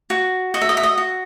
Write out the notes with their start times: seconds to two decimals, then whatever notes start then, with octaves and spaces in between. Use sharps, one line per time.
0.10 F#4
0.54 F#4 D#5
0.62 E5
0.69 D#5
0.77 E5
0.83 D#5
0.98 F#4